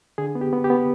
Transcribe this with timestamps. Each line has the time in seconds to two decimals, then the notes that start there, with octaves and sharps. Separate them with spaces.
0.18 D3 G#4
0.35 B3
0.41 G4
0.53 B3
0.64 G4
0.70 B3